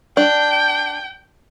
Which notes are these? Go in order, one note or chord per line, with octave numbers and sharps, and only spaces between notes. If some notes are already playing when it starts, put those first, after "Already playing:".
D4 G5